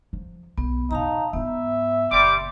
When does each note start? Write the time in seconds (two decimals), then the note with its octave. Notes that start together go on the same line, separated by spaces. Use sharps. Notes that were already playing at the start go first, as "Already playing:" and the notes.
0.13 F3 F#3
0.58 B1 B3
0.91 E2 B2 D#4 F5 A5 A#5
1.33 G#2 B3 F4 E5
2.12 F#1 A#2 G3 C6 D6